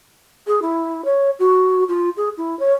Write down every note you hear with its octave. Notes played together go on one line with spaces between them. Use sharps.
G#4
E4
C#5
F#4
F4
G#4
E4
C#5